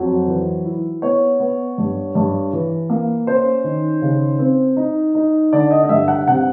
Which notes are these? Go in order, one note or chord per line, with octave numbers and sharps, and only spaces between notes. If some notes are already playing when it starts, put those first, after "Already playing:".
Already playing: F2 F#3
E3
E4
B3 C#5
B3
G2
G2
E3
A#3
C#4 C5
D#3
C#3
C4
D#4
D#4
D3 D5
D#5
D#5
G2 E5
F#5
C3 F#5